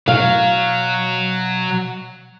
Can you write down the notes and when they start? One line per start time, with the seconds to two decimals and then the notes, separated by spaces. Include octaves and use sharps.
0.08 B2 F#3 F5